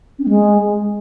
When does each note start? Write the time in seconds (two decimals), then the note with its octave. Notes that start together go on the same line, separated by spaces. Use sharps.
0.19 C#4
0.24 C4
0.29 G#3